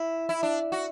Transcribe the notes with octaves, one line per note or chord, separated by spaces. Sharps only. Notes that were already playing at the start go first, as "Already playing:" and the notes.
Already playing: E4
E4
D4
F#4